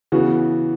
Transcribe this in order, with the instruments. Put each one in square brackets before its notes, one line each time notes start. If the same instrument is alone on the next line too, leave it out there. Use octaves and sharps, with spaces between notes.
[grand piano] C#3 E3 B3 F#4